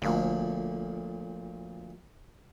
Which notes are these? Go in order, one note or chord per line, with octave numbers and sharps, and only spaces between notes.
G1 D2 A#2 F3